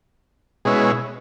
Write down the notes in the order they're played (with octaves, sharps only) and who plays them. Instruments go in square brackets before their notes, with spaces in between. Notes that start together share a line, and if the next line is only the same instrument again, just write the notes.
[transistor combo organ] B2 G#3 C#4 E4